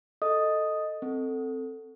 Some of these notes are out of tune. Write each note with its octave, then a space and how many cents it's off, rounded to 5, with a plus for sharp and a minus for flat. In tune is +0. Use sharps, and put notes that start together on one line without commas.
A4 +5 D#5 +0 D#6 +0
C4 +0 A4 +10